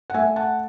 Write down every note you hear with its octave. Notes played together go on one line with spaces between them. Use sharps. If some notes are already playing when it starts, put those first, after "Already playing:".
F#5
A3 E5 G#5
F#5 A5